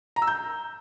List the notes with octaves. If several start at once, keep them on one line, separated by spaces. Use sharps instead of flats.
A#5
E6
G6